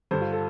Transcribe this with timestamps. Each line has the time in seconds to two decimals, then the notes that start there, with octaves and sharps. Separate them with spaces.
0.11 G2 D3 C5
0.21 F4
0.32 A4